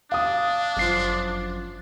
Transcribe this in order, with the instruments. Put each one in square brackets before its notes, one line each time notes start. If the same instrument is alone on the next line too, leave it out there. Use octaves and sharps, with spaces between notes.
[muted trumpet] D4 [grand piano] F5 D#6
[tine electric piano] G1 C7 [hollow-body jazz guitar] F#2 F3